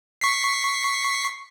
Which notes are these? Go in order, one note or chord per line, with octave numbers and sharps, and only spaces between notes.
C#6 B6 C7